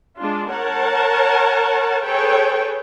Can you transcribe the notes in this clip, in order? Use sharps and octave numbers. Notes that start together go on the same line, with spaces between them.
G#3 D4 F4
A#4 C#5 F#5 A5
G#4 A4 B4 C#5 G5